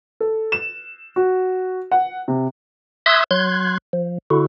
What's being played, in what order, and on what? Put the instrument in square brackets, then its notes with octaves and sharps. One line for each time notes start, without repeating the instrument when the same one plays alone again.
[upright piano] A4
E7
F#4
F#5
C3
[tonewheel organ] E5 C6 D#6 E6 F#6 G#6
F#3 C6 F#6 G#6
F3
D3 E4 F#4